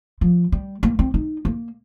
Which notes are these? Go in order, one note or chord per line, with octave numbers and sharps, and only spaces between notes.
F3
G3
A#3
C4
D#4
A#3